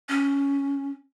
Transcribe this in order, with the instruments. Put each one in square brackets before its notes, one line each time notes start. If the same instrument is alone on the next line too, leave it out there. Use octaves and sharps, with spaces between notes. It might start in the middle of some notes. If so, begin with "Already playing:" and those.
[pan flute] C#4